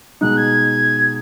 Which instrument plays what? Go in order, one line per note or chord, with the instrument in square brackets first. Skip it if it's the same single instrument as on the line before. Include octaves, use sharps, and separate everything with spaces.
[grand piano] B2 G#3 D#4 [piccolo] F#6
[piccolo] G#6